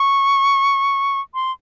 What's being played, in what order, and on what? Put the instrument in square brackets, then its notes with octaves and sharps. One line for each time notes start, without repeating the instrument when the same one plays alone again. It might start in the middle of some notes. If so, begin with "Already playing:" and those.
Already playing: [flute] C#6
C6